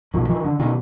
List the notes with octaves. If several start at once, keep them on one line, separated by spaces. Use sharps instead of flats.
B1 B2 D#3 F3
D#3 F3
D3
B2 D#3